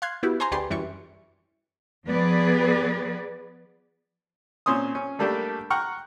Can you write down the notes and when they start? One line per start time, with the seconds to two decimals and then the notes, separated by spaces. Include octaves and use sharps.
0.02 F5 C6 F#6 G#6
0.23 B3 E4 F#4 G4
0.40 C5 G#5 A#5 C6
0.52 D2 G4 G#4 B4 D5 C6
0.70 F#2 E3 G3 C#6
2.07 F3 B3 G#4 B4 D5
4.66 A#2 C4 C#4 C6 D#6
4.95 C#4
5.19 G3 A3 A#3 D4 G4 A4
5.70 F#5 G5 A#5 C#6 F6